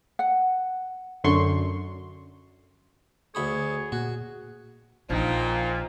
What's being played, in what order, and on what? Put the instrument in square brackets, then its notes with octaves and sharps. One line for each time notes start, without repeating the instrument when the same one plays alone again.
[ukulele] F#5
[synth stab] F#2 D3 C6 C#6
[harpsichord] D2 B5 D#6 [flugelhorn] G#4 [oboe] C#5
[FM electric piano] A#2 [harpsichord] F#4
[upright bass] A#1 [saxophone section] A#2 [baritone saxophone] F3 [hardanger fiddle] D#4 G5